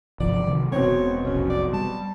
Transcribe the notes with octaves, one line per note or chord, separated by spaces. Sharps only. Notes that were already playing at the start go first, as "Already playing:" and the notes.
G1 C2 F3 D5
C3 D#3 F#3
E1 B2 C4 C#5
F1 B1 C#4
D5
G3 A5